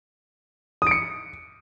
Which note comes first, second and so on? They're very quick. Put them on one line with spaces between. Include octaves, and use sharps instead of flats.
D#6 D7 C#7